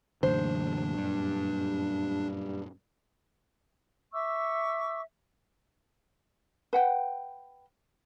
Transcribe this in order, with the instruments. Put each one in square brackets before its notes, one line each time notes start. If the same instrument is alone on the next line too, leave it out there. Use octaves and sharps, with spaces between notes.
[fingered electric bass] F#2 A#2 F#3 [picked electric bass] D3 E3 A3 [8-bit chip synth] D4 [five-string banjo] C5
[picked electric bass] G2
[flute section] E5 C#6 D6 E6
[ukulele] B4 F#5 G5